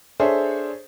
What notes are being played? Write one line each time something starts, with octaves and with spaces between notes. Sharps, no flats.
D4 G#4 A4 C5 C#5 E5